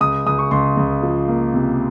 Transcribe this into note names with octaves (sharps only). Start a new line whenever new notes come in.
C#2 D#6
C#2 D#6
C#6
C#2 C6
C#2
F3
A#3
C3